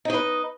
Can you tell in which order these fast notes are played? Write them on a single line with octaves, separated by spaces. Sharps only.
D#4 D#5 B4